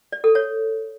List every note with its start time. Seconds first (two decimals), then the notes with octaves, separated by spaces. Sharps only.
0.12 D5
0.24 A4
0.35 C#5